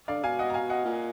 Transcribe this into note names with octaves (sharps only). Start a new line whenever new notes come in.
D3 D5 F5
B2 F5 G#5
D#5 F#5
A#5
F5 G#5
D#5 F#5
A#2